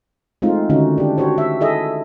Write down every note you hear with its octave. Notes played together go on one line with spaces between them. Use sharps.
G#3 A3 C4 D#4 F4
D3 D#3 C#4 D#4 F#4
D4 G4
F#4 G4 C5 C#5
E5
E4 G#4 A4 D#5 E5